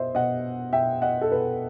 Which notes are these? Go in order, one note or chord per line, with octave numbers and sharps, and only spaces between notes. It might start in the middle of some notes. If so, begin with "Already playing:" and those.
Already playing: B2 C5 D#5 E5
B2 D#5 F#5
B2 E5 G5
D#5 F#5
A4
B2 B4